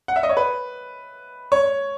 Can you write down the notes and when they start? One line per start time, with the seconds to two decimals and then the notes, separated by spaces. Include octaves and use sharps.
0.08 F#5
0.16 E5
0.23 D#5
0.29 C#5
0.37 B4
1.52 C#5